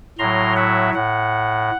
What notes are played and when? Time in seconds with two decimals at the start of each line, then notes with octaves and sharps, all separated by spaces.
0.18 A2 F#3 A#5 C6
0.56 E5 F#5
0.94 A2 F#5